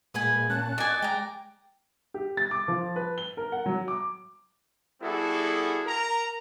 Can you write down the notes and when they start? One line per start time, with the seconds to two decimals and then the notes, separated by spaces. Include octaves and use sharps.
0.14 A#2 G#3 B4 F#5 G#5
0.50 A#2 C#4 A5 F#6
0.78 F#4 D5 D#5 G#5
1.02 G#3 G5 A#5
2.14 G4
2.37 A6
2.51 D6
2.68 F3
2.96 B4
3.18 G7
3.37 A#4
3.52 F#5
3.66 F#3
3.88 D6
5.02 G3 B3 E4 F#4 G#4 A4
5.86 A#4 A#5